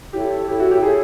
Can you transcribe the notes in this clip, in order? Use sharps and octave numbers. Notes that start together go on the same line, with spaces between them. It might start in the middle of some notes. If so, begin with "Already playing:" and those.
E4 G4 A4 C#5
E4 G4 A4 C#5
F#4
G4
E4 G#4 A4 C#5